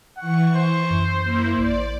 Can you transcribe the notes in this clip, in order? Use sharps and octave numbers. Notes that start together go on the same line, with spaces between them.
E3 F#5 C#6
C5
F#2
A#3 E4
A1 D5